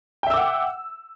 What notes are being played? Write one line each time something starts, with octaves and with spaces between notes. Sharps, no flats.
E5 F#5 G5 D6 E6